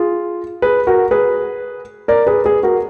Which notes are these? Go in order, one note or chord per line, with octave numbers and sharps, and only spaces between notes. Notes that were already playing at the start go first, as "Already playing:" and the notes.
Already playing: F4 G#4
G#4 B4
F#4 A#4
G#4 B4
A#4 D5
G#4 B4
G#4 B4
F#4 A#4